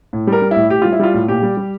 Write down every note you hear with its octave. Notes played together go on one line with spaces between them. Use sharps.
A2
G3
A#4
G3
A2 E4
A2 G4
G3 F4
E4
G3 F4
A2
A#2 G4
G3
G3